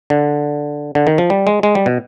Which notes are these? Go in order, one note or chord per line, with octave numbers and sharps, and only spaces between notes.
D3
D3
D#3
F3
G3
G#3
G#3
G3
B2